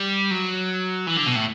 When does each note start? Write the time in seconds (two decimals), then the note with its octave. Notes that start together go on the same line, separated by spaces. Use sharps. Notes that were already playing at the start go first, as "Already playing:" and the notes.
Already playing: G3
0.31 F#3
1.07 E3
1.17 D3
1.26 B2
1.35 A2